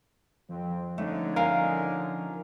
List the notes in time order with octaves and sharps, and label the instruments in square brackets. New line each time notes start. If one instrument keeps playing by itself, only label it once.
[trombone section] F2 C4 [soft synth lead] F3
[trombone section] D3 C#4 D#4 [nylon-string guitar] A3
[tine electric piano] A#4 [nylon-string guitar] F5 G#5